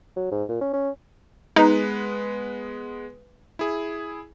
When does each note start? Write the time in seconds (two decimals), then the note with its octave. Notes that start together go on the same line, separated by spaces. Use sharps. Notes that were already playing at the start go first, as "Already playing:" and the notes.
0.16 F#3
0.32 G#2
0.49 A#2
0.61 C#4
0.73 C#4
1.56 G#3 B3 D#4 B4
3.59 E4 G#4